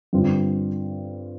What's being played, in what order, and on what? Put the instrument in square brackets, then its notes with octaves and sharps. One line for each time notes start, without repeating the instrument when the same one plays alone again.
[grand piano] G2 D3 G3 C4 F4